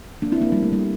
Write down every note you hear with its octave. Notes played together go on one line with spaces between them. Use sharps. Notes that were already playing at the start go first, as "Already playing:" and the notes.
A#3 D4
C4 E4
A#3 D4
G3 A#3
A3
G3 A#3